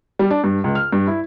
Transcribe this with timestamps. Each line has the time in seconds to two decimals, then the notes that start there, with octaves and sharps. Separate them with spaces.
0.19 G3
0.31 D4
0.44 G2
0.64 C#2
0.75 F6
0.92 G2
1.07 E4